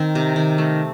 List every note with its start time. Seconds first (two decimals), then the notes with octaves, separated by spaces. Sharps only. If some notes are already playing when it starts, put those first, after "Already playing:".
Already playing: D#3 C4
0.15 C3
0.36 D#3
0.58 A3